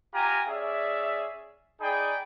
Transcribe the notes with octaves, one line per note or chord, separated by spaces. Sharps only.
F4 G4 F#5 G#5 A#5
C#4 G#4 D5 E5
D#4 G#4 D5 G5 G#5 B5